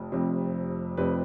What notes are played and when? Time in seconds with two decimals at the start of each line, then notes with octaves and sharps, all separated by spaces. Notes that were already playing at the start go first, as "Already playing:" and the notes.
Already playing: F1 F2
0.12 F1 F2 C3
0.97 F1 F2 C3 B4